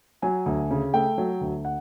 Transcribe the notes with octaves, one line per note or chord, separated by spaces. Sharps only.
F#3 G#5
D2
C#3
A3 G5
F#3
D2
F#5